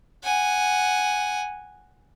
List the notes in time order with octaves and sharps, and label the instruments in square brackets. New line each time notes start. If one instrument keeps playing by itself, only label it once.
[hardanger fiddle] F#5 G#5